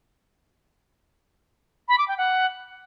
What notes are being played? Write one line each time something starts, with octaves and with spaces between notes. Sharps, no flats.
B5
D6
G5
F#5